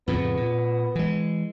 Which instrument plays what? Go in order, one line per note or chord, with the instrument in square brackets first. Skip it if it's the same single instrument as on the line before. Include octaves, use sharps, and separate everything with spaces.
[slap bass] F2 A2 C#3 [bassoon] B3
[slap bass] A#2
E3 G#3